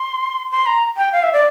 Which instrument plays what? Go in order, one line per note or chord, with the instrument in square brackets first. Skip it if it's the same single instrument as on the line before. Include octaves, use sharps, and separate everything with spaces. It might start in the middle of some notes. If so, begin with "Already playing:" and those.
Already playing: [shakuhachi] C6
C6
A#5
G5
F5
E5
D5